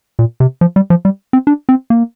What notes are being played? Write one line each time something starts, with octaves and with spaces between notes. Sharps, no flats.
A#2
C3
F3
G3
F3
G3
C4
D4
C4
A#3